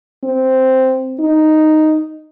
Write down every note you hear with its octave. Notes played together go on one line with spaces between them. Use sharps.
C4
D#4